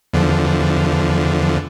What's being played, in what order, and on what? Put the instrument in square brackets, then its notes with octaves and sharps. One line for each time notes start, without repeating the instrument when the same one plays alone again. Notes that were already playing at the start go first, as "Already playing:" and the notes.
[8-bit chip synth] E2 D3 F3